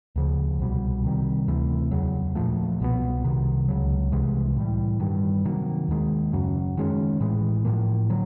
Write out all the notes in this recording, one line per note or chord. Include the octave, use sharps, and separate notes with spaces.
D2 C#3 F3
C2 B2 G3
C3 D#3 G3
D2 C3 E3 A3
E2 C#3 F#3
A#2 F3 A3
C2 B2 G#3 B3
C2 C3 D#3
C#2 C#3 F#3
C2 C3 E3 G#3
A2 E3 G3
G2 D#3 G3
C3 D#3 F#3 A#3
D#2 D#3 G#3
F#2 C#3 F#3
G2 D#3 G#3 C#4
A2 E3 G#3
A2 F3 A#3
D3 F#3